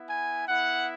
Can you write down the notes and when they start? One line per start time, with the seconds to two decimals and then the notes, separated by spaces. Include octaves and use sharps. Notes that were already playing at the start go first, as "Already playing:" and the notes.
Already playing: B3 E4
0.10 G#5
0.48 B3 E4 F#5